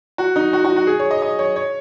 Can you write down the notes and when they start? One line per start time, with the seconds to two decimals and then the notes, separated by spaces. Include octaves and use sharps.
0.18 F#4
0.36 D#4
0.53 F#4
0.64 F#4
0.76 F#4
0.87 G#4
0.99 C#5
1.11 D#5
1.22 D#5
1.39 C#5
1.56 C#5